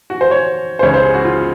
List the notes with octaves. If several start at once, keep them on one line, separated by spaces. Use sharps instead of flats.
F#4
C5
C#5
C5
C#2 C#3 C#5
C5
G#4
F#4
F4